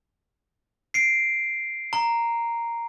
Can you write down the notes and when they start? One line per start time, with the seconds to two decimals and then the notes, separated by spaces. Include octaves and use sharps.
0.94 C7 D7
1.93 A#5